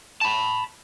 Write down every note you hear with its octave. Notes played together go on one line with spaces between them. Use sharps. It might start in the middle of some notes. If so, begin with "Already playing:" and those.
A5 B5